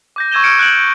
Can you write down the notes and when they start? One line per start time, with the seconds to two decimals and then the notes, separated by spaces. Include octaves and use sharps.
0.16 D6 G6 A#6
0.32 C#6 E6 G#6 D#7 E7 G7
0.44 F6 G#6 C#7 D7
0.59 F#6 G6 D7 E7 F#7